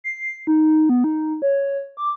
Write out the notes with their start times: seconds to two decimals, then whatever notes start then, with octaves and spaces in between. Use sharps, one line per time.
0.04 C7
0.47 D#4
0.89 B3
1.04 D#4
1.42 C#5
1.97 D6